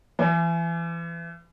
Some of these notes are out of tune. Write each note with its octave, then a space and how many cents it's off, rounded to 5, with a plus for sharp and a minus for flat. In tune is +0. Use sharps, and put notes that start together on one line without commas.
E3 +30